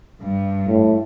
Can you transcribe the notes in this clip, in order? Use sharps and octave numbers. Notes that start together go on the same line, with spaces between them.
G2
A2